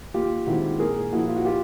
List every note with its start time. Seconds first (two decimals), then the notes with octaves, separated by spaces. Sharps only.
0.14 D#2 F4 G4
0.47 D#3 G#3 C4 E4 F#4
0.79 A#1 G#4 A#4
1.12 A#2 F3 E4 F#4
1.28 F4
1.36 F#4
1.45 F4 G4